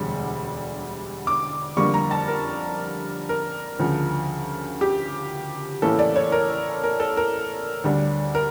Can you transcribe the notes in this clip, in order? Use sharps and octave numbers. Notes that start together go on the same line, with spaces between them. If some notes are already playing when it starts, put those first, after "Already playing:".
Already playing: E1 D2 D3 G3
D6
F2 D3 G3 A#3 C#6
A#5
A5
A#4
A#4
D2 C#3 F3
G4
A2 E3 A#3 C#4 E4 A4
D5
C#5
A#4
A#4
A4
A#4
D2 D3 G3 D4
A#4